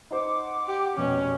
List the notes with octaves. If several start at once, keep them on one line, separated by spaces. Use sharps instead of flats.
D#4 C5 F#5 D6
G4
F1 B2 C#4